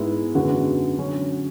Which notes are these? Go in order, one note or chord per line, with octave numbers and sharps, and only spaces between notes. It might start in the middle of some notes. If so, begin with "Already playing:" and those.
Already playing: G#2 G#3 B3 E4
F#2 D3 G#3 B3 F#4
D3 F#3 C#4